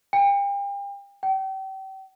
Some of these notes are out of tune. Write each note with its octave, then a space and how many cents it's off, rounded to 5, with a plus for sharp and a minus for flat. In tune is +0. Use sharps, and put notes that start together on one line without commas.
G5 +35
G5 -35